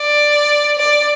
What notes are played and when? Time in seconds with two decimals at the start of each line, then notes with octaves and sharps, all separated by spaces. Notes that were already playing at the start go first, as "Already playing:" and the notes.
Already playing: D5
0.78 D5